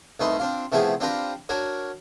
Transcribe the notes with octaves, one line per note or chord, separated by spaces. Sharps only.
C2 A3 D#4 B4 C6
C4 D4 F4
C3 F3 A3 B3 E4 G#4
C4 D4 F4 G4 B4 A#5
D4 F#4 A#4 C#5